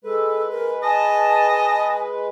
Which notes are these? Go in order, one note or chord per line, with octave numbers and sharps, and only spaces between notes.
G#3 A4 B4
A#4
D#5 G#5 A5